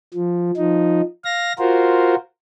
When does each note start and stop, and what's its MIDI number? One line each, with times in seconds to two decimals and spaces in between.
0.14 0.51 53
0.57 1.01 53
0.57 1.01 63
1.25 1.53 77
1.25 1.53 94
1.59 2.15 65
1.59 2.15 66
1.59 2.15 70
1.59 2.15 72